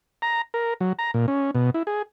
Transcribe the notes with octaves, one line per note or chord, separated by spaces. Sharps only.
A#5
A#4
F#3
A#5
A#2
C#4
B2
E4
G#4